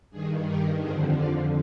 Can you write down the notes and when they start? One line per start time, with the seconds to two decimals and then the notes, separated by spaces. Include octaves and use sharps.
0.11 G2 D#3 G#4
0.45 G4 A#4
0.80 F2 D3 F3 G#4 C5
1.15 D5 F5